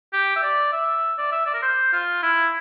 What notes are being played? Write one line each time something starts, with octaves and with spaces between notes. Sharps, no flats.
G4
E5
D5
E5
D5
E5
D5
A#4
C5
F4
E4